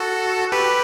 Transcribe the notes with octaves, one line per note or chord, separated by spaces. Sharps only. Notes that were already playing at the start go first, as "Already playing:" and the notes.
Already playing: F#4 A4
G4 B4